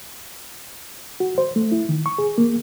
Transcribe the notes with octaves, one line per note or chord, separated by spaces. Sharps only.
F#4
C5
A3
E4
D#3
C#6
G#4
A#3